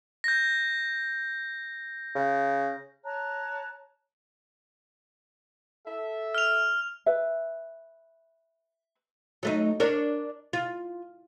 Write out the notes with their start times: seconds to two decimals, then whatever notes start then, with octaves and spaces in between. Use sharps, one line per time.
0.24 G6 A#6
2.15 C#3
3.05 C#5 A5 A#5 F#6
5.86 A4 E5
6.35 F6 F7
7.06 B4 E5
9.43 F#3 A3 D#4
9.80 D4 A#4 C#5
10.53 F4